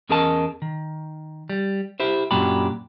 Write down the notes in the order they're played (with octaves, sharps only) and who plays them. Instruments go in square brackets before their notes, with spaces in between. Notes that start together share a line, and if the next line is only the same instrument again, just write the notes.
[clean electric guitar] E2 C#4 G#4 A#4 D#5 A5
D#3
G3
E4 G4 C5
F#2 A#2 F#3 D4 G4 B5